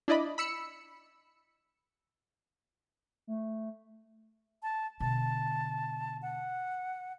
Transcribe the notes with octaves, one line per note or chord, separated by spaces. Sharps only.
D4 E4 D5 D#5 B5
B5 E6 C#7
A3
A5
B2 D3 A5
F#5